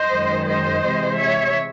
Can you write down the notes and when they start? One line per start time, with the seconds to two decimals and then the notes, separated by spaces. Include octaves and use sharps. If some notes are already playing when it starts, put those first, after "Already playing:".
Already playing: C5 D#5
0.10 F#2 D#3 G#3
0.46 C5 D#5
0.83 C3 E3 G#3
1.18 C#5 E5